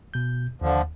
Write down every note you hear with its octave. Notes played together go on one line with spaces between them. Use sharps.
B2 G6
D#2 D3 F3